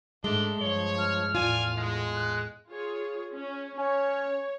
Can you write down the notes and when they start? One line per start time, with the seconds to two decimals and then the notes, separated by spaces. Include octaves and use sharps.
0.24 G#2 G#3 A3 D4 G7
0.61 G2 F3 C#5
0.98 F6
1.35 E2 A2 F4 D5 G#5
1.77 G#3
2.15 F#6
2.69 F4 G#4 C#5
3.34 C#4
3.78 C#4 C#5